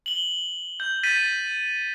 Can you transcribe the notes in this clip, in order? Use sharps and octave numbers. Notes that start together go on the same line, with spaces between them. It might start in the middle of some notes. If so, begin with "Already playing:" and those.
F#7 G7
G6
G6 A6 B6 D#7